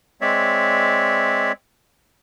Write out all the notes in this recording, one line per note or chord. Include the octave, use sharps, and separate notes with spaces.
G#3 C4 C#5 D5 E5